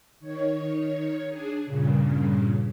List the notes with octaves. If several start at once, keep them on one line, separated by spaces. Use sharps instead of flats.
D#3 C#5
D4 G#4
G2 A#2 C#3